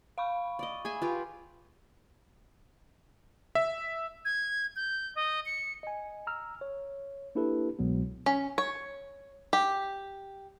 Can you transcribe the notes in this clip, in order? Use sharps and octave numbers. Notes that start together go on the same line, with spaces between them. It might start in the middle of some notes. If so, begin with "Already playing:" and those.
F5 B5 C#6
D5 D#5
G#4 E5 G#5
F4 G4 B4
E5
G#6
G6
D#5
C#7
D#5 G#5
A#5 E6 F6
C#5
A#3 D4 E4 G4 A4 B4
C2 B2 F#3 G#3 B3
C#4
C#5
G4